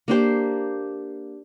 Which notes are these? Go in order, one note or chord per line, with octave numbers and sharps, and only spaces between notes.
A#3 D4 G4 C5